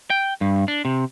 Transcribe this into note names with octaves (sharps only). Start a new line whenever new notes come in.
G5
G2
D4
C3